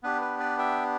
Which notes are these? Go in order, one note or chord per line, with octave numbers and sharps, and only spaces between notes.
B3 D4 G4 B4
B4
B4 D5
E5 G5